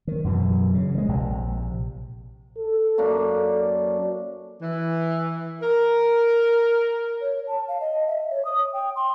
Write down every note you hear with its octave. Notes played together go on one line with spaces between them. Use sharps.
D#3
F#2 B2 E3
C#3
F3 G#3
A#1 C3
A4
F#2 A#3 D4
E3
A#4
C#5
A5
F5
D#5
E5
C#5
D#6
G5
C6